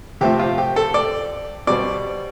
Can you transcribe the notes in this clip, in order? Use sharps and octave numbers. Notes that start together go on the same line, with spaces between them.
C3 F3 A3 C4 G4
F4
G4
A4
D5
B2 G3 C4 D5